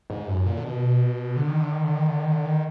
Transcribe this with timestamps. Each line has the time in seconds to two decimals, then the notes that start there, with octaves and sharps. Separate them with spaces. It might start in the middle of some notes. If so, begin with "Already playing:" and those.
0.10 G#2
0.28 F#2
0.46 A#2
0.57 D3
0.64 B2
1.36 D3
1.48 D#3
1.60 D3
1.72 D#3
1.84 D3
1.95 D#3
2.08 D3
2.19 D#3
2.31 D3
2.45 D#3